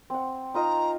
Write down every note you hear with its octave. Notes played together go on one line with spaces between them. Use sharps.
C4 F#5
D#4 F4 D#5 A#5